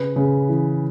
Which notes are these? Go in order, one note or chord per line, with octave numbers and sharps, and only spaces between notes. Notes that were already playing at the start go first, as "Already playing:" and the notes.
Already playing: C#3 B4
C#3
E3